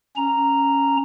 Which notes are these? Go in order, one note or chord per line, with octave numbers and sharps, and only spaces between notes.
C#4 A#5